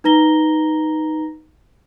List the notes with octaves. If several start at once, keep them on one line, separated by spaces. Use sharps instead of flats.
D#4 B4 A#5 A#6 G7